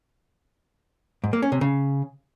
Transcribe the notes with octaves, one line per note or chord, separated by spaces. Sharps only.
G#2
A#3
C#4
C3
C#3